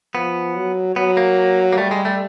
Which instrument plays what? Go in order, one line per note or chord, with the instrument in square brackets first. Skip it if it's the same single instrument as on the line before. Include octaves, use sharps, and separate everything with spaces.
[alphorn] F3 [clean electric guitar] B3
[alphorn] F#3
[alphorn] F#3 [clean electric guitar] B3
[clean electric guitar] A#3
A#3
[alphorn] G3 [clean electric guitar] A3
[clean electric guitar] G#3
A3